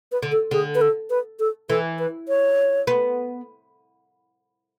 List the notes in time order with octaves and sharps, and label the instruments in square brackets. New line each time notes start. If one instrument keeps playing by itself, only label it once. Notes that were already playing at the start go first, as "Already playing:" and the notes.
[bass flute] B4
[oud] D3
[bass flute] A4
[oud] D3 [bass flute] G#4
[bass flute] B4
A4
B4
A4
[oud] E3 [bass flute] A4
[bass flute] B4
C#5
[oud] B3